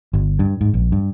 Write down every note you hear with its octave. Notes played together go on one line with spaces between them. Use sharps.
G1
G2
G#2
A#1
G2